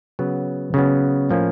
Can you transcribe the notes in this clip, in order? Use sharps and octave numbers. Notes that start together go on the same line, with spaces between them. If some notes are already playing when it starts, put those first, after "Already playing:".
C#3 F#3 B3
C#3 F#3 B3
A2 F3 A#3 C#4